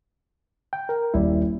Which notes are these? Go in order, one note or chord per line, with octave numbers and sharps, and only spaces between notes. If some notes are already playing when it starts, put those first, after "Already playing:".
G5
A#4
D#1 E4 D5